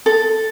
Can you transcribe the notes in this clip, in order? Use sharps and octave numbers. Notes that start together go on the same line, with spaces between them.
A4